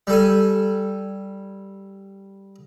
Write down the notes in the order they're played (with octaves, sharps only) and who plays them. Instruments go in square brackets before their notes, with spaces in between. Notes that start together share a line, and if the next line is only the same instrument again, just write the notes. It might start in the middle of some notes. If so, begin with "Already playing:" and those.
[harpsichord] G3 A4 G#5